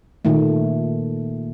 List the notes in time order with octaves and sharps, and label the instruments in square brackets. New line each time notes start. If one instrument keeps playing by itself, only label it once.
[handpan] A#2 D#3 A3